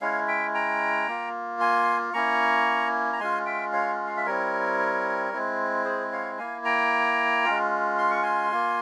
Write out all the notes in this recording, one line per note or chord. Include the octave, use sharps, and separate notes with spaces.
G#3 C#4 E4 C#5 F5
E5 G5
G5 A#5
A#3 F4
G#5 C6
A#3 C#4 E4 A#5 C#6
A#5
G#3 C#4 F4 G#5 C6
E5 G5
C#5 F5
F5
E5
G3 C4 E4 A#4 C#5
G#3 C4 E4
G#4 C5
C#5 F5
A#3 E4 F5 G#5
G5 A#5
G#3 C#4 F4
C6
C#6
G#5 C6
A#3 F4